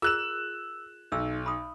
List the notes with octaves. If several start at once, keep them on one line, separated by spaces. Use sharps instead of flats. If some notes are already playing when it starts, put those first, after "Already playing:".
F4 G#4 A#4 E6 F#6 E7
B1 D#4 E6
B5 D#6